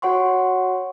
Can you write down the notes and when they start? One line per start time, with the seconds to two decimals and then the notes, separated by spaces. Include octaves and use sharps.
0.02 F#4 C#5 F#5 C6 C#6